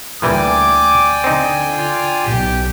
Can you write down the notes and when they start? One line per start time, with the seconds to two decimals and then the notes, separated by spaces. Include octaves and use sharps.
0.22 D2 A#2 E3 G3 D5 G5 G#5 D6
1.24 D3 C4 D#4
1.69 F4
2.24 B1 G4